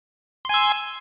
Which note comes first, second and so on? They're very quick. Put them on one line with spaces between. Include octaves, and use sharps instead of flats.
C6 G#5 E6